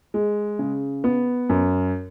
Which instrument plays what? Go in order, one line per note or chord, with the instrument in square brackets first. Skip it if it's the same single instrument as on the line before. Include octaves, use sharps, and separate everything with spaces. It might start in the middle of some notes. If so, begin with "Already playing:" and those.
[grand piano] G#3
C#3
B3
F#2